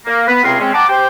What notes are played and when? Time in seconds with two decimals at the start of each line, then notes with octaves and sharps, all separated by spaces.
0.06 A#3
0.27 B3 B4
0.44 C#2 C3 C4 G#4 A#4 C6
0.59 G#3 C4 C#4
0.73 F#5 G5 A5 A#5 D6
0.89 G4 C5 G5